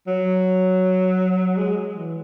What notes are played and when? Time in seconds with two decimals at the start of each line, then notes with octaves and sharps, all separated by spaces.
0.07 F#3
1.57 G#3
1.95 E3